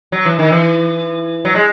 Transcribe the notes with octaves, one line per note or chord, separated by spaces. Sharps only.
F#3
E3
D#3
E3
F#3
G#3